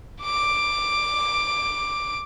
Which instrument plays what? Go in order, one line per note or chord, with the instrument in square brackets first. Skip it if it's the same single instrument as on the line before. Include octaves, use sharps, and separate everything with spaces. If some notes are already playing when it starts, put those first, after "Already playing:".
[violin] D6 D7